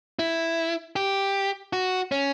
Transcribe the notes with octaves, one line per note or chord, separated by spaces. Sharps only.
E4
G4
F#4
C#4